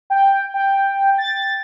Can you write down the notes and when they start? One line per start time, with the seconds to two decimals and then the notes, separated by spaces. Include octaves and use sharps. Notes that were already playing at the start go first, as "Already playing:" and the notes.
0.10 G5
0.54 G5
1.18 A6